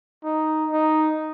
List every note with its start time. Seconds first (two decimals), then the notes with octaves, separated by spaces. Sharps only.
0.24 D#4
0.71 D#4